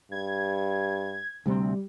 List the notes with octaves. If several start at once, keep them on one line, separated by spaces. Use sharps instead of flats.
G2 G#6
D2 C3 G3 C4